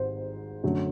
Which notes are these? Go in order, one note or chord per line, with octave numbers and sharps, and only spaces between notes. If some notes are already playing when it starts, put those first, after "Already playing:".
Already playing: G#1 G#2 G3 C5
F#2 D3 F#3 A3 C#4